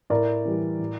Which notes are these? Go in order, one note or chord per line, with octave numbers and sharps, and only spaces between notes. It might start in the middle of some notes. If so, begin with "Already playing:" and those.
A2 A#4 D5
E3 G3
A2